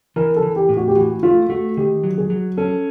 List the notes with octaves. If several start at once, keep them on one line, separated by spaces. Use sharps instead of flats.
E3 A#4
A4
E3
G4
A2
F#4
G4
E3 F#4
A3 F4
A3 F#4
D#3 G4
F#3
G#4
F#3
C#4 A4